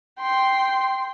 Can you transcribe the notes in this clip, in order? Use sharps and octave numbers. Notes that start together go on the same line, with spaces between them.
G5 C6